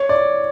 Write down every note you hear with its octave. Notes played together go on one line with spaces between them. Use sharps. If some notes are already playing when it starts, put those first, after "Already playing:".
Already playing: C#5
D5